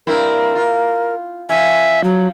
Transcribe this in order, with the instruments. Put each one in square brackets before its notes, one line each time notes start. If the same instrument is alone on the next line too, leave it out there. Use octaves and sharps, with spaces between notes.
[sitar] G2 C4 E4 [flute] A#4
[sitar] F4
[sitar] F3 C#4 [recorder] E5 [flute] G#5
[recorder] F#3